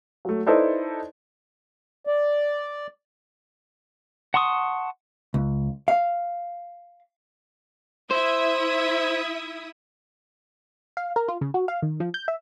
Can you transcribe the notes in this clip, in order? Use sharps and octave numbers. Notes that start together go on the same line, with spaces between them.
F#3 A3
D#4 E4 A4 B4 C5 D5
D5
F#5 A5 C6 C#6 D#6
C#2
F5
E4 C5 E5 D#6
F5
A#4
F4
C#3
F#4
F5
D#3
F3
G6
E5